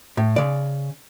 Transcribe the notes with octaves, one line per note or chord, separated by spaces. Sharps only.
A2
C#3 D5